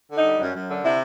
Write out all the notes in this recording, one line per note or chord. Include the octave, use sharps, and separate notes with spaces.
D3
D#4
G3
F#2
F#2
D3
C3 E4